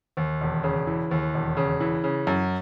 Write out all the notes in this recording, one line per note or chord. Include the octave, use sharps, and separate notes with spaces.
D#2
E1
C#3
E3
D#2
E1
C#3
E3
C#3
F#2